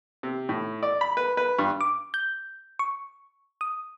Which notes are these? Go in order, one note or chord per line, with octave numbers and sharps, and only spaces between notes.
C3
A2
D5
B5
B4
B4
G2
D6
G6
C#6
D#6